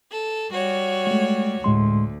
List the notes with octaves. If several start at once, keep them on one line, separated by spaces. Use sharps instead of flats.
A4
G3 F#4 C#5
G#3 A3
D2 A2 G#3 C6